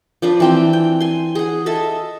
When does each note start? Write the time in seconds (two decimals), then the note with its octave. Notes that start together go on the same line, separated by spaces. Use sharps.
0.22 F3 D4 B4
0.40 E3 C4 G5
0.73 G5
1.00 G#5 C6
1.35 G#4 F#5
1.66 A4 D#5 E5 A5